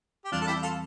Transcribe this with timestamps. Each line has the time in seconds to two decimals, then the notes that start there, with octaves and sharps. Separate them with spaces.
0.25 G4
0.32 E2 E3 G3 C4 D4 F4
0.41 A4
0.47 E4 G4
0.62 F4 A4